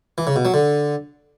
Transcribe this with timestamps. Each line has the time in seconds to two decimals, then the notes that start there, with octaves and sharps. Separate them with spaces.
0.18 E3
0.27 C#3
0.36 B2
0.45 F#3
0.54 D3